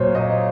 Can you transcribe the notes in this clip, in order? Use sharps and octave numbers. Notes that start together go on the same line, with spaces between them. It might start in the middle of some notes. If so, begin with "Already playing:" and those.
Already playing: A#2 F#3 C5 C#5
D#5